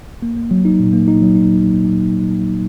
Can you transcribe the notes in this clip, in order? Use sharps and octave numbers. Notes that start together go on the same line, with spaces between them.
A#3
A#3
F#3
D#4
A#2
A#3
D#4
F#3
D#4